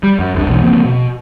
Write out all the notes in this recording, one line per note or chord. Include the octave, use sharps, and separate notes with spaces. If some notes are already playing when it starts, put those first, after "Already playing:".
G3
F#2
F1 C2 D4
B1 E2 B2 E3
C#3 F3 A#3 C4
B2